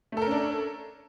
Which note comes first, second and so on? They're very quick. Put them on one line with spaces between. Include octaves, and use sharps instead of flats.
A3 A4 A#4 C#4 D4